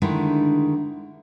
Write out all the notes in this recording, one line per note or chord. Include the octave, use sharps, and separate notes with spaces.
D3 D#3 G#3 A3 D4 E4